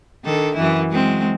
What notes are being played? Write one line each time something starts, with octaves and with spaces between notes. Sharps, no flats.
D#3 D4 A4
F#2 E3 E4
F#3 G#3 C4